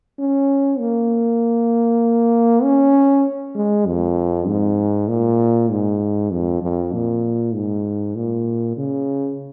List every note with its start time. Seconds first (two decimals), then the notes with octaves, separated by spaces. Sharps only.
0.19 C#4
0.79 A#3
2.63 C#4
3.55 G#3
3.86 F2
4.47 G#2
5.08 A#2
5.71 G#2
6.31 F2
6.62 F2
6.93 A#2
7.54 G#2
8.16 A#2
8.77 C#3